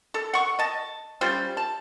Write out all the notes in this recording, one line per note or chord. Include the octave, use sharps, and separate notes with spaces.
A4
F#5 C#6
D#5 A5
G3 C#4 F4 C5
A5